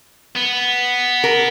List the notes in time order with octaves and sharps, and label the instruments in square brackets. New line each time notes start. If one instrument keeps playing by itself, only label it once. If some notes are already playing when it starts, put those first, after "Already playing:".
[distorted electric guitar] B3
[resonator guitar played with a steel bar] A#4